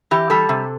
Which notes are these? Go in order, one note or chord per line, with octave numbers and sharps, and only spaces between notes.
E3 G4
G3 A4
C3